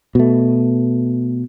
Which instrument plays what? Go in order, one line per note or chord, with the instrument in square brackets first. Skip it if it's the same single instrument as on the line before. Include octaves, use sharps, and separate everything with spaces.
[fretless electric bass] B2 A3